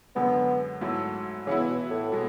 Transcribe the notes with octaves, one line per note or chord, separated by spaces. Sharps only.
F#2 D3 G#3 B3
G#2 F#3 A3 E4
C#3 E3 B3 E4
B2
A2
B2 G#3